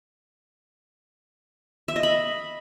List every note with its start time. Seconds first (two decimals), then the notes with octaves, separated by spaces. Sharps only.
1.88 E5
1.96 D#5
2.03 B5